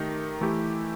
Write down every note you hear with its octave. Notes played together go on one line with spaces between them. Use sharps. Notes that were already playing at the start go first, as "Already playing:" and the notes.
Already playing: D#3 A3 D#4 G4
E3 A3 E4 G4